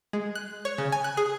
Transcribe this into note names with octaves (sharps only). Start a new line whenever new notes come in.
G#3
F#6
C#5
C#3
G#5
F#6
G#4